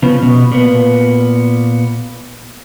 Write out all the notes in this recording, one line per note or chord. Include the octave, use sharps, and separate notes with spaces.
C#3 F3 B3
B2
A#2 B3